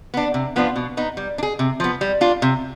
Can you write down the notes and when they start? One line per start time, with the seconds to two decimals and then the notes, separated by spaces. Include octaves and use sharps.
0.14 B3 D4
0.34 C3
0.56 F3 B3 D4 F4
0.76 B2
0.97 B3 D#4
1.17 G3
1.38 D4
1.43 G#4
1.59 C3
1.80 F3 B3
2.01 G3
2.21 D4 F4
2.42 C3